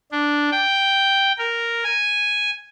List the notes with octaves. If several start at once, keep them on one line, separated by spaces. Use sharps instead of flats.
D4
G5
A#4
G#5